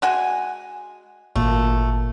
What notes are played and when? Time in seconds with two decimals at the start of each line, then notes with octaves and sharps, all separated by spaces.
0.02 G#3 F#4 G#5
1.36 G#1 A#2 A3 A#3